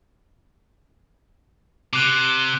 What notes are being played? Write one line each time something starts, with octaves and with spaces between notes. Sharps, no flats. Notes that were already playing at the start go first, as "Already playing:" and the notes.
C3 D6 F#6 G7